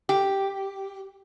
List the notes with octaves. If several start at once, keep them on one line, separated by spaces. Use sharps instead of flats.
G4